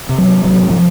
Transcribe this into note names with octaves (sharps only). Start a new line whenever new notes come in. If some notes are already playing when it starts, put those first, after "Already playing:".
C3
F#3
C3
A1 F#3
G#2
F3